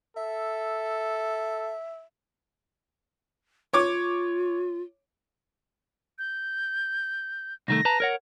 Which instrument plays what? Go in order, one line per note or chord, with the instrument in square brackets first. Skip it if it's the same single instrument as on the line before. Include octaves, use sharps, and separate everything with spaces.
[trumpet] A4 [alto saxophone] E5
[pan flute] F4 [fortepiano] C#5 D6
[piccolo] G6
[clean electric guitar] C2 D#3 A3 [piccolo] A#6
[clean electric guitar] B4 A5 A#5
A#4 C#5 F#5